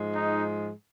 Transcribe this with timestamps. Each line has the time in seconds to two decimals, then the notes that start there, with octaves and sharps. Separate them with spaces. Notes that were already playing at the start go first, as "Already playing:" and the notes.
Already playing: G#2 F3 G#3
0.11 D#4